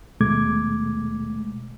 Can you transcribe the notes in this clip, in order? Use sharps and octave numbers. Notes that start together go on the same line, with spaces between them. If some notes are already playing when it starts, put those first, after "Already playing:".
D#2 B2 G#3 A3 D6 G#6